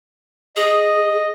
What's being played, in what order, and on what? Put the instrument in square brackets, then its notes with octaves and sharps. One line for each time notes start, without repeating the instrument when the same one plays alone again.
[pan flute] G#4 [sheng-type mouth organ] D#5